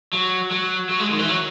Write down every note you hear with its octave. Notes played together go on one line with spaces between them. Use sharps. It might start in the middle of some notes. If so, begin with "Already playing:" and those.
F#3
F#3
F#3
G#3
D#3
E3
F#3